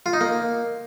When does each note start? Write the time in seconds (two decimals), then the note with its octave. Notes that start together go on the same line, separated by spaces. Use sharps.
0.06 F4
0.13 D#4
0.21 A#3